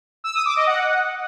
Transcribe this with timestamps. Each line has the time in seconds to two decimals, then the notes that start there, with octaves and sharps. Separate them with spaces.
0.24 E6
0.35 D#6
0.45 D6
0.56 D#5
0.67 F#5